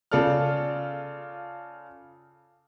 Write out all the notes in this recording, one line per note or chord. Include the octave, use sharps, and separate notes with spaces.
C#3 F4 A4 D5 F6